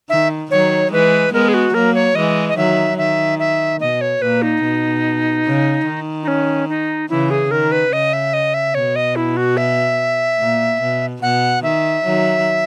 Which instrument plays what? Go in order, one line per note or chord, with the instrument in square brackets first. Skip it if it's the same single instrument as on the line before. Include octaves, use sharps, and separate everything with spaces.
[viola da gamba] D#3 [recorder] E5
[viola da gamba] D#3 F#3 [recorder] C#5
[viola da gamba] E3 G#3 [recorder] B4
[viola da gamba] G#3 B3 [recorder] A#4
[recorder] G#4
F#4
[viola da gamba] F#3 A#3 [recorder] A#4
[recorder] C#5
[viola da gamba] E3 G#3 [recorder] D#5
[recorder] D#5
[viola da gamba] D#3 F#3 [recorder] E5
[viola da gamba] D#3 [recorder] E5
[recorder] E5
[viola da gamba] B2 [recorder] D#5
[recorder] C#5
[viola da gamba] A#2 [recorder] B4
[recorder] D#4
[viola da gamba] B2
C#3
D#3
[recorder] D#4
C#4
D#4
[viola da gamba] C#3 E3 [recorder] E4
[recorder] G#4
[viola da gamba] D#3 [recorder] A#4
[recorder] B4
[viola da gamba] C#3 [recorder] D#5
[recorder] E5
D#5
E5
[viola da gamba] B2 [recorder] C#5
[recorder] D#5
E4
F#4
E5
[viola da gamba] A#2
B2
[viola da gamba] B2 [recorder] F#5
[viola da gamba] D#3 [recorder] E5
[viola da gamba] D#3 F#3